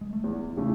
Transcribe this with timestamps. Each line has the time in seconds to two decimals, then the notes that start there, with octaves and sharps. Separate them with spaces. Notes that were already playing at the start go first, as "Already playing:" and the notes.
0.01 G#3
0.13 A3
0.24 E2 B3
0.57 C#3 E3 A3 C#4